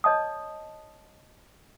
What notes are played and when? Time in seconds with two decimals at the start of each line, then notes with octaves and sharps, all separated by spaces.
0.04 C#5 D#5 A5 D#6